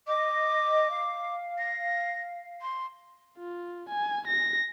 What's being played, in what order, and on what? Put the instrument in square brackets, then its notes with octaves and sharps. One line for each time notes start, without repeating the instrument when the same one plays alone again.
[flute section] D#5 [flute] D6
[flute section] F5
[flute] A#6
C6
[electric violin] F4
G#5
A#6